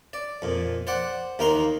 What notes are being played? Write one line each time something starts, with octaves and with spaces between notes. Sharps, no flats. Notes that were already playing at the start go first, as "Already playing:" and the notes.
D5
F2 A#2
C5 D5 F#5
D#2 A#3 D#4 A#4 A#5 C6